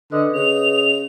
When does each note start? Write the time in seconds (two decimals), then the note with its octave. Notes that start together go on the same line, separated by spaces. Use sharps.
0.12 D3 B4 D#5 D#6 F#6
0.34 C#3 F7